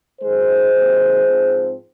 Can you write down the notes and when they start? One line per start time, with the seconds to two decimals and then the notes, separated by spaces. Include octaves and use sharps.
0.21 F#2 D#3 G#3 G#4 C5
0.72 C3 D#3 F#3 A#3
1.24 G#2 F3 C4